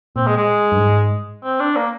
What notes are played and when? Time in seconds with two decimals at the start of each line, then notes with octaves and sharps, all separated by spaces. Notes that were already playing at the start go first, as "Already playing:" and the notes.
0.16 A#2 C4
0.27 G#3
0.37 G#3
0.72 G2
0.80 G#2
1.43 C4
1.60 D4
1.76 A#3